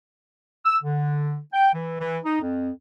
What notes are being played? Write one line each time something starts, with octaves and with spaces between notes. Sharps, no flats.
E6
D3
G5
E3
E3
D#4
F2